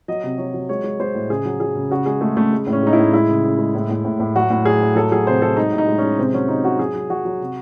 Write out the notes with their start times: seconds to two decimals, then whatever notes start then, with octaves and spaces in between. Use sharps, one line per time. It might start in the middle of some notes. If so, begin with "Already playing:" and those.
0.08 F#3 D#5
0.24 C3
0.38 F#3 C#5
0.54 F#3
0.69 G#3 C#5
0.84 G#3
1.00 G#3 C5
1.15 A2
1.29 C#3 G#4
1.45 F#3
1.60 F#3 G#4
1.75 C#3
1.90 C#3 F#4
2.06 G#3 G#4
2.21 G#3 A3
2.36 C#3 A3
2.53 G#3
2.67 A2
2.73 C#4
2.83 G#3 D#4
2.93 E4
2.98 A2
3.13 G#3 E4
3.28 C#3
3.44 C#3
3.59 G#3
3.75 A2
3.90 A2
4.05 A2
4.20 A2
4.35 F#3 F#4
4.50 A2
4.65 F#3 G#4
4.81 A2
4.96 F#3 A4
5.11 F#3 G#4
5.27 C3 C5
5.42 F#3 A4
5.57 G#3 D#4
5.72 A2
5.78 D#4
5.88 G#3
5.98 G#3 C#4
6.18 C3 C4
6.33 F#3 C#4
6.48 C3 D#4
6.64 F#3 F#4
6.79 F#3 G#4
6.95 F#3
7.10 F#3 F#4
7.25 F#3
7.41 C3